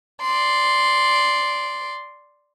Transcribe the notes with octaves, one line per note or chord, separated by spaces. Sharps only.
D5 C6